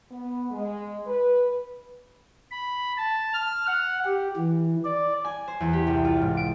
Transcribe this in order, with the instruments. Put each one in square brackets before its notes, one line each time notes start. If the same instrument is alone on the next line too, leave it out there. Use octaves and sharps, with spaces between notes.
[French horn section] B3
G#3
B4
[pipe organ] B5
A5
F6
F#5
G4
E3
D5
[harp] G#5
C5
E2
G4
C2
F4
G#2
D7